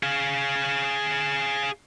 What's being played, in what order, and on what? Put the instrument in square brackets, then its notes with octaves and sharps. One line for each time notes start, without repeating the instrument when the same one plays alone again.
[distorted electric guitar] G#4 F5